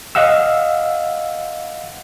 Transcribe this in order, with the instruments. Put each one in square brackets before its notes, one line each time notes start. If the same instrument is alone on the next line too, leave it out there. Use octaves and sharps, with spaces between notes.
[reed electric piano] D#5 F5 F#5 E6